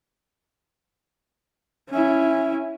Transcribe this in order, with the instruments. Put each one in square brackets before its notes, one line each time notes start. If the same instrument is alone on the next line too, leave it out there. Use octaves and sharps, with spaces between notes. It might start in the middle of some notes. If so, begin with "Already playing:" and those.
[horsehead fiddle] C#4 E4